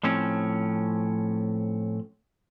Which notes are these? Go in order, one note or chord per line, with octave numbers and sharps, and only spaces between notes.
A2 F3 C4 C#4